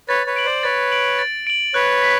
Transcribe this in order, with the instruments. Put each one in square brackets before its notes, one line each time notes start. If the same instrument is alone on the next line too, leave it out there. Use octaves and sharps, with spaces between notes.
[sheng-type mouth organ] B4 C#5 [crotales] A6
[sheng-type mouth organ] B4 C#5
[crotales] D7 F#7
[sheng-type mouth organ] C5 D5
[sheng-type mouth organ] B4 C#5 [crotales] A6
[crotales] D7 F#7
A6
D7 F#7
[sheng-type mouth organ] B4 C#5 [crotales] F#6
[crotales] B6